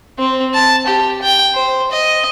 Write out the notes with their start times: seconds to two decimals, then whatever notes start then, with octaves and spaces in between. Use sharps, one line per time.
0.18 C4
0.54 A5
0.87 G4
1.22 G5
1.54 C5
1.91 D#5